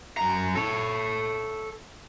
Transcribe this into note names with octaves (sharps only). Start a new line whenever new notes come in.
F#2 A#5
A4 C#5